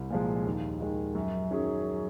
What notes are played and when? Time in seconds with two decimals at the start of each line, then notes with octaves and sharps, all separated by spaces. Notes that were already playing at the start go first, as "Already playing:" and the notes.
Already playing: C2
0.10 A#2 F3 G#3
0.45 D#2
0.81 D#3 G#3
1.15 F#2
1.51 D#3 F#3 C#4 G#4